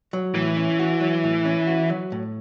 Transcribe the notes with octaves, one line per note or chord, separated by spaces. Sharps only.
F#3
A2 E3
C#4
F#4
F#3
A2
C#4
F#4
F#3
A2